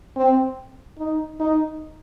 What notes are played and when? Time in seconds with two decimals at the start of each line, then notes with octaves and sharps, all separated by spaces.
0.16 C4
0.98 D#4
1.40 D#4